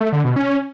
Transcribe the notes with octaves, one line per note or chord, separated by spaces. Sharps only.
A3
D3
B2
C#4